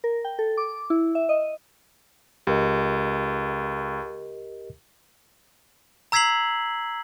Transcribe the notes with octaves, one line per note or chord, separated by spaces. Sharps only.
A#4
G5
A4
D6
E4
E5
D#5
C#2 G4 A#4 D#5
A#5 E6 G#6 B6 C7 F#7